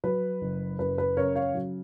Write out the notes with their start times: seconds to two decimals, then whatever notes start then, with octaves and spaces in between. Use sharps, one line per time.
0.04 F#3 B4
0.42 F#1
0.79 F#2 B4
0.98 B4
1.17 C#3 A#4 C#5
1.35 C#5 F5
1.54 F#3